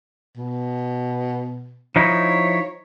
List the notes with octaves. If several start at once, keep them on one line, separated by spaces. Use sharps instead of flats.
B2
F3 D#4 E4 C#5